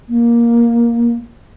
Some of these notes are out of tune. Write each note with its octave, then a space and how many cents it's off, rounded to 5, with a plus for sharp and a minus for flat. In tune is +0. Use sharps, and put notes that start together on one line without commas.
A#3 +10